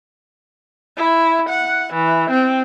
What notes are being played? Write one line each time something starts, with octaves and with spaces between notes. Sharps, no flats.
E4
F#5
E3
C4